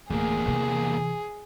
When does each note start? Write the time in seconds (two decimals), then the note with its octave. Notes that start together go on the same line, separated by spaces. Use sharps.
0.10 D1 E2 A#3 G#4
0.45 C3 E3